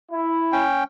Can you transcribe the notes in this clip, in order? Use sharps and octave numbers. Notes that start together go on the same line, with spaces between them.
E4
C#4 G5